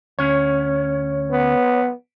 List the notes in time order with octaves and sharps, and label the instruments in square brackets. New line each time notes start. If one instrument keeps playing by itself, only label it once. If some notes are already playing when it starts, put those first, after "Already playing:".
[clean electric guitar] D2 C#4 [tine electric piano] C#5
[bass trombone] B3